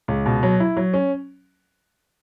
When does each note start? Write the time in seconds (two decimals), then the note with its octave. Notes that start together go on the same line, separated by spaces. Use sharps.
0.08 C#2
0.26 B2
0.43 F#3
0.60 E4
0.77 F#3
0.94 C#4